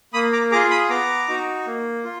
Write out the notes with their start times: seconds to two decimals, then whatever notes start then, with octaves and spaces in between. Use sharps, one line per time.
0.13 A#3 B5 D#6
0.33 A#5 D6
0.52 F4 G#4 A#5 D6
0.71 B5 D#6
0.89 B3 A#5 D6
1.28 D#4 F#4
1.66 A#3
2.04 F4